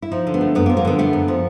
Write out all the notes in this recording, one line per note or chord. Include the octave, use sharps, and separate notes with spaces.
E4
F3 D#4
D3
B3
A3
F#2 B3
A#3
F3
A#3
D3 B3
A3 B3
F#2
F3